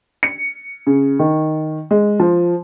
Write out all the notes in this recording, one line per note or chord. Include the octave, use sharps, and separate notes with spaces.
C#7
C#3
D#3
G#3
F3